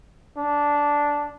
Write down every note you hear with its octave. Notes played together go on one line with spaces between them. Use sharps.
D4